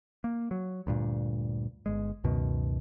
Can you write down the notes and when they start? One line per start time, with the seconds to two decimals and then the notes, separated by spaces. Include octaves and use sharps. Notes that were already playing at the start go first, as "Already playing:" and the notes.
0.24 A#3
0.51 F#3
0.87 D2 G2 A#2
1.86 G1 G#3
2.24 C#2 F#2 B2 D#3